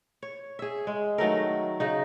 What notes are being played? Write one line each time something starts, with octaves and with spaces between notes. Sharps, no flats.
C#5
G#4 E5
G#3
D#3 F#3 A3 A#4
C#3 D#4